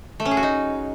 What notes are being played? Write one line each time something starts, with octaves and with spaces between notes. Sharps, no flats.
A3
C#4
G#4
F#4
D#4